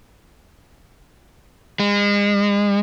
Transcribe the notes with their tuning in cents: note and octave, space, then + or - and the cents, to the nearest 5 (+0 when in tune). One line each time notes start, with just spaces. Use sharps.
G#3 -35